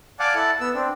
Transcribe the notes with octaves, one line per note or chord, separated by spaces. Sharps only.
D5 F5 F#5 G#5 A5 D6
E4 A4 F#5 A5
B3 E6
C4 D4